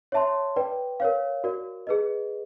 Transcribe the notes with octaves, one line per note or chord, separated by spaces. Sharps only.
C#5 E5 A5 C6
B4 D5 G5
A#4 C#5 F5
F#4 A#4 D5
G#4 B4 D#5